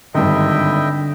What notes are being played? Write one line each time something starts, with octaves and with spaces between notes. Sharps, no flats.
G#1 G2 D3 D#5 E5 G5